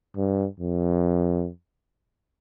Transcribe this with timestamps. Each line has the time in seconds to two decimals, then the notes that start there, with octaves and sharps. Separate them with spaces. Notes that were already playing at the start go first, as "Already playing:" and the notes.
0.17 G2
0.60 F2